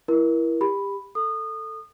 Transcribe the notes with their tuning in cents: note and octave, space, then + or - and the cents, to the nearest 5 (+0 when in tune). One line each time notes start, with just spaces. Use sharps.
E4 +15 A#4 +30
G4 +25 B5 +0
A4 +10 D#6 -25